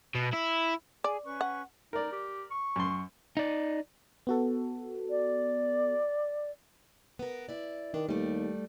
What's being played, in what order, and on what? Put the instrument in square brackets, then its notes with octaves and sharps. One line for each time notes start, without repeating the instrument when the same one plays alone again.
[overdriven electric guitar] B2
E4
[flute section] G#4 G#5 [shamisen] D5
[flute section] C#4 B4 C#6
[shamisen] F#5
[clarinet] D#4 [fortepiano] A#4 D5
[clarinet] G4
C#6
[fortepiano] F#2 C6
[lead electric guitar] D#4 D5
[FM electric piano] B3 F#4 A4
[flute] D5
[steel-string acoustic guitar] B3 A#4
E4 D5
[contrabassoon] D#3 [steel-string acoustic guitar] D4
[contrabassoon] D#2 [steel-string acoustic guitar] G3 A3